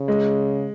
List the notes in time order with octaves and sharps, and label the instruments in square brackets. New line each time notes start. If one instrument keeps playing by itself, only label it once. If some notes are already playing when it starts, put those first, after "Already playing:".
Already playing: [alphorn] C#3
[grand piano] G#3